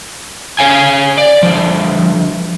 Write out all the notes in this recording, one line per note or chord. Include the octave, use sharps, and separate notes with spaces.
C#5 F5 G#5
D5
D3 F3